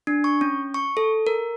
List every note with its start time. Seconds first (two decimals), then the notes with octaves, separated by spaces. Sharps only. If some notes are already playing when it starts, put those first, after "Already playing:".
0.07 D4
0.24 C#6
0.41 C#4
0.74 C#6
0.97 A4
1.27 A#4